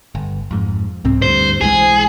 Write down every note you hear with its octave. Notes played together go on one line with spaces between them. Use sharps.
G1
F2 G#2
C2 G#2 C4
D2 G2 C5
B1 E3 G#3 G#4